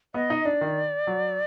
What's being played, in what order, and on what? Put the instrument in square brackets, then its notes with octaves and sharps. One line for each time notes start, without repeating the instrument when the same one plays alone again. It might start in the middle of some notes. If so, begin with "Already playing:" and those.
[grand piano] B3 [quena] D#5
[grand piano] D#4
[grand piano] D4 [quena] D5
[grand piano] D#3
F#3